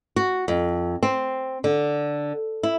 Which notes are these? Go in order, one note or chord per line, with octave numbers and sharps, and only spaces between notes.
F#4
F2
C4
D3
E4